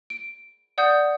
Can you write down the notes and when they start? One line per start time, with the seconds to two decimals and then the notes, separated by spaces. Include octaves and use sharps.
0.10 D7
0.78 D5 F#5 D#6 G6